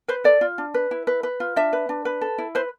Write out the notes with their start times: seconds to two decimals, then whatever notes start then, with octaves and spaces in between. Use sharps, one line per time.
0.08 B4 C5
0.24 A4 D5
0.41 F4
0.58 D4
0.74 B4
0.91 E4
1.07 B4
1.23 B4
1.40 F4
1.56 D4 E5
1.73 B4
1.89 D4
2.05 B4
2.21 A4
2.38 E4
2.55 B4 C5